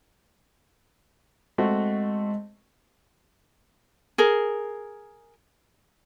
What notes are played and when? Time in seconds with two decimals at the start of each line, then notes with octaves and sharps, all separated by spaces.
1.58 G#3 A3 C4 F#4
4.18 G#4 A#4